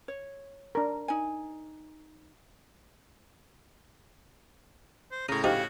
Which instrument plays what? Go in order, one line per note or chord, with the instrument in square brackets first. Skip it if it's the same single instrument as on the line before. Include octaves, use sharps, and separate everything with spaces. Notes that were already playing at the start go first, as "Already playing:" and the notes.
[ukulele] C#5
[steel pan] D4 A#4
[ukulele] D#4 G#5
[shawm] C5
[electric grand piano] A2 C#3 [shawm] A#5 [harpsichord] D#6
[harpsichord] F3 D#4 D#5 [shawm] F#4 [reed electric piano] G4 F5